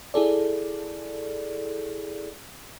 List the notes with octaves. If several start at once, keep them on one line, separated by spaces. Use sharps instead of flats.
E4 G#4 A4 D5